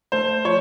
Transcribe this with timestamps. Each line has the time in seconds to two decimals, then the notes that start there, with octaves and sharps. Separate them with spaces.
0.12 A3 C5
0.45 F3 C#5